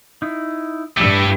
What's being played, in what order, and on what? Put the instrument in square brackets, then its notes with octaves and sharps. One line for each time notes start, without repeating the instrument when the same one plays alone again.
[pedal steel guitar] D#4 E4
[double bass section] G2 [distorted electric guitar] A3 E4 [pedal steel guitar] G4 E6